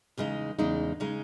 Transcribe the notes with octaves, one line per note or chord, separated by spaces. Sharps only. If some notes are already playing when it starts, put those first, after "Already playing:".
E2 C#3 G#3 D#4
E2 C#3 G#3 D#4
C#3 G#3 D#4